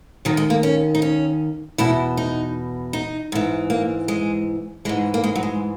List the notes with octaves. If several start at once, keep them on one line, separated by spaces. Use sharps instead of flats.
D#2 D#3 F#3
G#3
A#3
C#4
D#4
C#4
E2 B2 E4
D#4
D#4
G#2 E3
A#3
G#3
G#2 E3 G#3
A#3
G#3
F#3
G#3